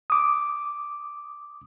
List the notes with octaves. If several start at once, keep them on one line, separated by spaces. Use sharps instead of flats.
D6 D#6